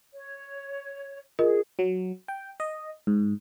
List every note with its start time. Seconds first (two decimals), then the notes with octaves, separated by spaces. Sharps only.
0.13 C#5
1.39 F4 G#4 A#4 D#5
1.79 F#3
2.28 G5
2.60 D#5
3.07 G#2